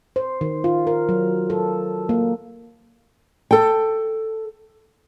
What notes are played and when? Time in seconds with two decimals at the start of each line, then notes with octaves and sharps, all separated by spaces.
0.16 C5
0.41 D#3
0.64 F4
0.87 A#4
1.09 F#3
1.50 A4
2.09 A#3
3.51 A4 G5